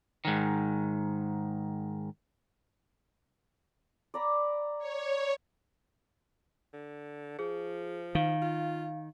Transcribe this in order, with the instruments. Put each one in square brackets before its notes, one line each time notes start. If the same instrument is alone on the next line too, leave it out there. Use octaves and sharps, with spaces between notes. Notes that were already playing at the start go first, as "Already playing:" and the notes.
[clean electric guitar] G#2 D#3
[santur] D5 A#5 B5
[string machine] C#5
[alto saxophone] D3
[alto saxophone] F3 [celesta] G#4
[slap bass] D#3 [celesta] F5
[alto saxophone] F4